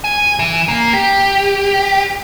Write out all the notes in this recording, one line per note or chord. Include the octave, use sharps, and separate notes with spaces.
G#5
E3
A#3
G4